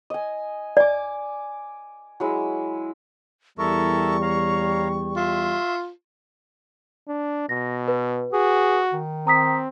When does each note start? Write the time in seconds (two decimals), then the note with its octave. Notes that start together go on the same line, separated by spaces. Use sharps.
0.10 D#5 G#5
0.77 D5 G#5 D6
2.20 F#3 G#3 E4
3.58 E2 G3 E4 A4 A#4 C#6
4.22 C#5 F5 A#5
5.16 F4 E5 C6 C#6
7.08 D4
7.49 B2 A#6
7.88 B4
8.33 F#4 G#4
8.93 D#3
9.27 C4 A#5 D#6 B6